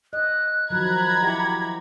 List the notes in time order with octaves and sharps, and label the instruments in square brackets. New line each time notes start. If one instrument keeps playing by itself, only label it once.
[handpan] D#5 [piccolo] F#6
[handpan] D#3 F3 F#3 [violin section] A#5 B5 G#6
[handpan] E4 G4 F#5